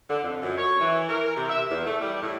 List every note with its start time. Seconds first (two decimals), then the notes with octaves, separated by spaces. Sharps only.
0.10 D3
0.23 F2
0.41 F#2
0.58 C#5
0.81 E3
1.09 A#4
1.36 C3
1.49 E5
1.70 E2
1.86 A3
2.01 G3
2.22 A2